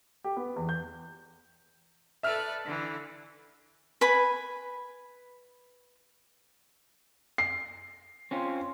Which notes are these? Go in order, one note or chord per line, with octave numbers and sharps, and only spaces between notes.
G4
B3
E2
G6
A4 B4 D5 E5 F6
D3 E3
B4 G#5 B5
C7
C4 C#4 F4